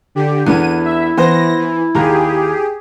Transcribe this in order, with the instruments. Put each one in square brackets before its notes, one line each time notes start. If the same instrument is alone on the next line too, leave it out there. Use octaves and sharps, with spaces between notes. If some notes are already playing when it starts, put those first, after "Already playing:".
[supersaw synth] D3 G4
[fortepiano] E2 D3 B3 [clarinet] E4 [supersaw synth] D#7
[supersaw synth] E5
[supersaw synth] E3 A#6 [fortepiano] B3 C5
[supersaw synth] E3
[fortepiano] D#2 A#5 [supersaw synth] G4 G#4